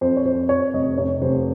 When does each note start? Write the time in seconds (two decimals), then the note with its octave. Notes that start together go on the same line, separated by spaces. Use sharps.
0.01 F2 C5
0.17 C#5
0.25 F2 C5
0.49 F2 C#5
0.74 F1 D#5
0.97 C3 C#5
1.22 F1 C5